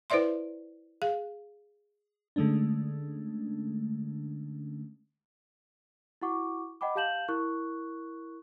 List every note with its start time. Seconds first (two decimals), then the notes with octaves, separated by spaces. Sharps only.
0.10 E4 B4 C5 D5 E5 C6
1.02 G#4 F5
2.36 D3 G#3 A3 C#4 D4
6.22 E4 F#4 F#5 C#6 D6
6.81 D#5 F#5 G5 B5 D6
6.95 G4 F5 A5 G6 E7 F#7
7.28 E4 A#4 C#6 F#6